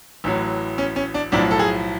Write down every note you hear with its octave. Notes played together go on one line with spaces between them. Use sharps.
A1 A2 F#3
C#4
C#4
D4
B1 A2 F3 D4
A4
G#4